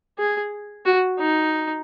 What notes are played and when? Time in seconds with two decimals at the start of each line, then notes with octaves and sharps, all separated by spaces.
0.19 G#4
0.85 F#4
1.19 D#4